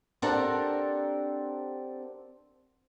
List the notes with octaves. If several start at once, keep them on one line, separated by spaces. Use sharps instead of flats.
C4 D4 G4 A4 A#4 F#5